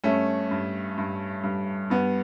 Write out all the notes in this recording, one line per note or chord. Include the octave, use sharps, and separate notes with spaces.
G2 A3 C#4
G2
G2
G2
G2 B3